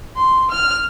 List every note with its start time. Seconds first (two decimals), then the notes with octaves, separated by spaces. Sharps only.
0.16 C6
0.51 F6